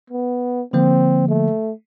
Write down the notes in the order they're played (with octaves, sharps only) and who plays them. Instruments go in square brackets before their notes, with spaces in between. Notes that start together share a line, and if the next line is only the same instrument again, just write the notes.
[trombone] B3
[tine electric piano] D3 F3 A#3 [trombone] C4
[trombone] A3